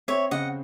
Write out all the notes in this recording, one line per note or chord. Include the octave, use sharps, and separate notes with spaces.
C4 C#5 E5
C#3 D#5 F#5